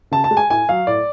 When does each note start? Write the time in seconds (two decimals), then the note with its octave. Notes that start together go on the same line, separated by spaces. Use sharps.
0.11 C#3 A5
0.24 A5
0.31 G#3
0.37 G#5
0.50 A2 G#5
0.69 F#3 F5
0.87 A2 D5